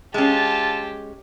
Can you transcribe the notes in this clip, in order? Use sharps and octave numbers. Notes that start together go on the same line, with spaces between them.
G#3 C#4 F4 G4 A4 A5